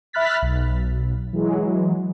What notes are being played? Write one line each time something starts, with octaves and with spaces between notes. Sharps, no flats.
E5 B5 F6 F#6 A6 B6
B1
E3 F#3 G#3